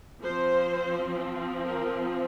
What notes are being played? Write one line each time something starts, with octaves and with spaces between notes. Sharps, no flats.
F3 C4 C5
A#4